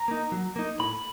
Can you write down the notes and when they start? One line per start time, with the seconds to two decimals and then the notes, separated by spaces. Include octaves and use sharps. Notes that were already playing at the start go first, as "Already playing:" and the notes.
Already playing: A#5
0.08 A#3 D#4
0.32 F#3
0.56 A#3 D#4
0.79 A2 B5